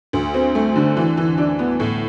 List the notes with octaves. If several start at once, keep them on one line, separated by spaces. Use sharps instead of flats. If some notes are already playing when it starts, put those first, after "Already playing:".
D2
C4
A3
D3
E3
E3
D4
B3
A2